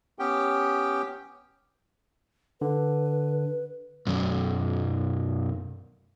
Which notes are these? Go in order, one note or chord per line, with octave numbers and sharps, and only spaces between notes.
B3 C#4 G4 G5
D3 B4
B1 F#2